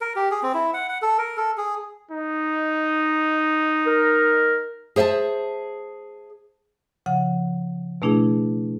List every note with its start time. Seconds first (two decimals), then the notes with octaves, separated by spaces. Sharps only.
0.01 A#4
0.16 G4
0.31 G#4
0.43 C4
0.54 E4
0.74 F#5
0.89 F#5
1.02 A4
1.19 A#4
1.37 A4
1.58 G#4
2.11 D#4
3.87 A#4
4.96 G#4 C5 E5 F5 A5
7.06 C#3 F3 F#5
8.02 B2 A3 D4 E4 G#4